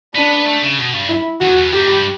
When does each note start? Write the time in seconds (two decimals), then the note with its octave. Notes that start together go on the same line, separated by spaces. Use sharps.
0.15 B3 D4
0.46 A3
0.62 C#3
0.79 B2
0.93 G2
1.09 E4
1.40 E2 F#4
1.56 E2
1.72 F#2 G4
1.87 G2